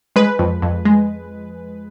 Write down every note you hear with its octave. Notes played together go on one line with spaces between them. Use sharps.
G#3 B4
F2
F2
G#3